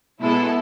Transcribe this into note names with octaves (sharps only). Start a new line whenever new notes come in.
B2 G#3 B3 E4 A4